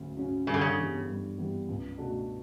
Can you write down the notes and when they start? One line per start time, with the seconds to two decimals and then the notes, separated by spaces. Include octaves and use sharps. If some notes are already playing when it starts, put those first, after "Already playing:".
Already playing: D2 C#3 F#3 C#4
0.17 C#3 F#3 C#4 F#4
0.47 G2 C#3
0.54 D3
0.61 C#3
0.77 E3 G3 B3
1.08 G2
1.38 E3 G3 B3
1.68 C#2
1.98 B2 A3 D4 F#4